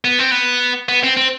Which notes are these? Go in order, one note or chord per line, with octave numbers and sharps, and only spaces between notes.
B3
C4
B3
B3
C4
C4